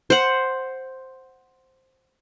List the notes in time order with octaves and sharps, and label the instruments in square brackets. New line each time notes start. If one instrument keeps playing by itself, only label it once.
[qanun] C5 F#5